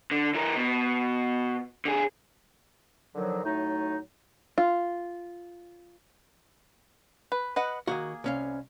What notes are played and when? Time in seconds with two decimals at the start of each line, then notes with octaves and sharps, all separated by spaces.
0.11 D3
0.35 E3 A#4
0.56 B2
1.85 D3 G#4
3.15 D3 D#3 F3 F#3
3.44 A2 F#3 A3 D#4
4.58 F4
7.32 B4
7.56 B4 D#5 F#5
7.87 D#3 A#3 F#4 G#4
8.24 C2 C#4 F5